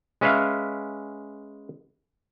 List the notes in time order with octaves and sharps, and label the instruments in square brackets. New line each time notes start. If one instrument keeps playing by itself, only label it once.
[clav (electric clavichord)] G#3 C#4 B4 E5 F5